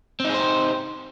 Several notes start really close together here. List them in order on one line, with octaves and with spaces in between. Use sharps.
C4 D#4 G#4 C5 G4